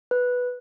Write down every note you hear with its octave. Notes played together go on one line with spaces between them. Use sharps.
B4